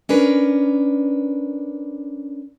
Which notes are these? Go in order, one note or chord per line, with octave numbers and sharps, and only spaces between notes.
C#4 D4 A#4 B4